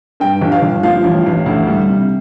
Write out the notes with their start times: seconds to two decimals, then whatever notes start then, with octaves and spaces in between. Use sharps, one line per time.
0.20 G2 G5
0.41 G1
0.52 F5
0.62 G1
0.83 F3 F5
1.04 A1
1.26 A1
1.46 D2
1.67 G3
1.89 C3